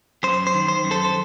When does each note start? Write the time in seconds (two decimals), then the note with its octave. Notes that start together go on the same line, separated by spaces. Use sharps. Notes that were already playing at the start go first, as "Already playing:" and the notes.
0.23 F#2 C5
0.47 C5
0.54 D#3
0.68 C5
0.84 F#2
0.91 A4 C5
1.05 C5